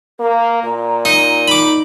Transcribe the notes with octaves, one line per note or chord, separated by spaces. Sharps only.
A#3 A#4
A#2 A#5
D#4
D#4 B5 D6